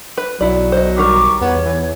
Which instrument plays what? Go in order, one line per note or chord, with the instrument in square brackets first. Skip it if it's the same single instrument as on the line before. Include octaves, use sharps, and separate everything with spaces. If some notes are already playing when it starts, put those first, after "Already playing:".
[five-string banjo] B4
[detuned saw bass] B1 [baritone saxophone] F#3 [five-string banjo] E4 D5
[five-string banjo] C5 D#5
[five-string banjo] D#3 G3 A#4 [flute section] A#5 C#6 D6
[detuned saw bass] E2 [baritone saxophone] B3 [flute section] C#5
[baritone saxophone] E3